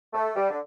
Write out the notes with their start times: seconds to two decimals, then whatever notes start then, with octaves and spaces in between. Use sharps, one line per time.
0.13 A3
0.35 G3
0.50 D3